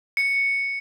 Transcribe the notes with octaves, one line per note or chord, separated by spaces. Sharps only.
C#7